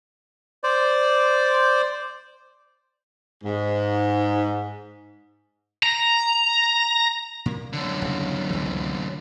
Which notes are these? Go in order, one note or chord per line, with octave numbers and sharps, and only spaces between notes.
C5 D5
G#2
A#5
A#2 A#3
F#2 D3
D#1 C#3
C#2 E3